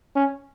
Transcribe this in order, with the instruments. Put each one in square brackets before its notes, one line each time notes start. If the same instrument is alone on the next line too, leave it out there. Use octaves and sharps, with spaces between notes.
[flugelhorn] C#4